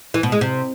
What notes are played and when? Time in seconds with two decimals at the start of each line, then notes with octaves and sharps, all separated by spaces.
0.14 E3
0.23 B2
0.32 G#3
0.41 C3